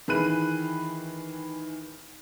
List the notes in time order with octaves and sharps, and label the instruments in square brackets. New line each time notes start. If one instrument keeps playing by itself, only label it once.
[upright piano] D#3 E3 G#4 B5 F#6 D#7